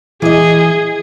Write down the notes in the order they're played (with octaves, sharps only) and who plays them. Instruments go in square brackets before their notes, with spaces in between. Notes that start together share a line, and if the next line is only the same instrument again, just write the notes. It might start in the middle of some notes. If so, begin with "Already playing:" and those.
[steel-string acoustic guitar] E3 D#5 [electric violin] G#4